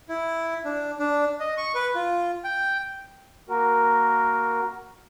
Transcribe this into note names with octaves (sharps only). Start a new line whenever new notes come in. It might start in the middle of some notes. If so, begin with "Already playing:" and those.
E4
D4
D4
D#5
C#6
B4
F4
G5
A#3 F#4 A#4